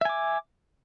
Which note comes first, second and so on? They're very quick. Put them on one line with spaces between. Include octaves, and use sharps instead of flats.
E5 G#5 D6